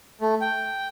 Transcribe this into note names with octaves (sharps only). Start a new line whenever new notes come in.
A3
G5